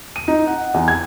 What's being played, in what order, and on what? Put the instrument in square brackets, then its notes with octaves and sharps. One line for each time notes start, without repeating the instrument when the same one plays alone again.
[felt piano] D#7
D#4
F#5
E2
G#6